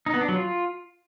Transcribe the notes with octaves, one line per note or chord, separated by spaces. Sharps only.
D#4
B3
D4
F#3
F4